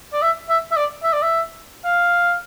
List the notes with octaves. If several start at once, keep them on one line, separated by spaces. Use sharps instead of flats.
D5
E5
E5
E5
D5
E5
D5
E5
F5